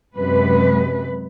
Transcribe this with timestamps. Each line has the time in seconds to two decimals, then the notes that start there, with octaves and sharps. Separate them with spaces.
0.16 F#2 C3 G#3 B4